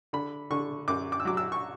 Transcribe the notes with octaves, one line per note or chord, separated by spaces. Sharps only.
D3 B5
D3 C#6
F#2 D6
D6
E6
F#3 D6
E6
C#6